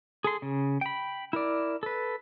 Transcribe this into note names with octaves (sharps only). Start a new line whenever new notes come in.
G#4 A4 C6
C#3
G5 B5
E4 A#4 D5
A4 B4